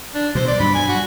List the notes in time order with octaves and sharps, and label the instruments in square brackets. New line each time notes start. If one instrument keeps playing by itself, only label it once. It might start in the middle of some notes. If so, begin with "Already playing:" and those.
[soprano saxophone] D4
[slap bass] B2 F#3 [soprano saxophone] C5
[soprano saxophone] D5
[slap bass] G2 F#3 [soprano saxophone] B5
[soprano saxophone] G#5
F#4